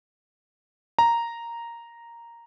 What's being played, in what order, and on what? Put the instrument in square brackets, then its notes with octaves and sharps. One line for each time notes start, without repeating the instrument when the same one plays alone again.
[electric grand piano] A#5